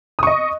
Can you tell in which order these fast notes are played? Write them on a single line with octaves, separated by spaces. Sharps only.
D#6 C#6 D#5